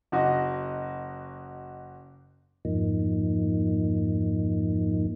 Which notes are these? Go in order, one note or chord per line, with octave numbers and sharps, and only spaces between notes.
F#1 F#4 D#5
F2 G#2 F3 A#3 D#4